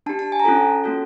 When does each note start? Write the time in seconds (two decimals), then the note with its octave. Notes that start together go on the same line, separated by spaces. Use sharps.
0.06 D4 G4 A5
0.19 A5
0.32 G#5
0.40 A#5
0.45 C#4 F4 A4 A5
0.84 A#3 C#4 F#4 A4